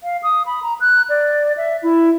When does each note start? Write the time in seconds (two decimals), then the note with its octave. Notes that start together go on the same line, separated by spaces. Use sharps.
0.03 F5
0.23 D#6
0.46 B5
0.62 A#5
0.80 F#6
1.09 D5
1.57 E5
1.83 E4